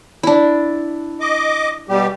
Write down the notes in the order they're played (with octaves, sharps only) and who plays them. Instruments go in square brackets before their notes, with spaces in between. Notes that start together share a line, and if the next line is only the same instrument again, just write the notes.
[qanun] D4 E4
[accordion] D#5 D6
B2 G3 G4